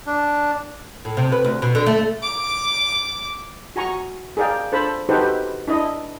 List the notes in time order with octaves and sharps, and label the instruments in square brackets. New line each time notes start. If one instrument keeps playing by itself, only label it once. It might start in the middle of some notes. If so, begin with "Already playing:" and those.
[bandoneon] D4
[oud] A2
C3
B4
D2
B2
D3
A3
[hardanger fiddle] D6
[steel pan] F#4 G#5 A#5 C#6
G#4 A#4 D5 F5 G5
D4 A4 C5 A5 B5
D#4 F#4 G4 A4 B4 C5
D4 E4 D#5